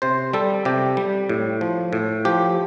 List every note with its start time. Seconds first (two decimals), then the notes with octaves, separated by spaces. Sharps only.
0.02 C3 C5
0.33 G3 A4
0.65 C3 G4
0.97 G3
1.29 A2
1.61 F3
1.93 A2
2.25 F3 G4